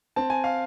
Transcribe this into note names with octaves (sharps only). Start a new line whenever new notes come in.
C4 A5
G#5
F5